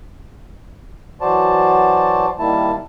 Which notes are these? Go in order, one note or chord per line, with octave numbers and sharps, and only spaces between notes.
E3 F#3 F#4 C5 D5 A5
D#3 G3 A#3 E4 A5